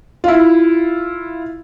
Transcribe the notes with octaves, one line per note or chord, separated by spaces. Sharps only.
E4 F4